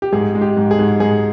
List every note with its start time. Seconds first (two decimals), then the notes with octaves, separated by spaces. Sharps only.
0.02 G4
0.12 G#2 G#4
0.35 G#3
0.41 G4
0.57 G#2
0.71 G#4
0.79 G#2
1.00 G#2 G#4